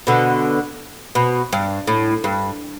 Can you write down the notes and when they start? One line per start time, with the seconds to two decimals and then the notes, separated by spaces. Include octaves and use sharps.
0.07 B2 D3
1.15 B2
1.53 G2
1.87 A2
2.24 G2